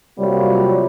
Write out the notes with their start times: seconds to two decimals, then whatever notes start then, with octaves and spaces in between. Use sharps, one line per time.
0.18 C3 F#3 G3 A#3 F4 C#5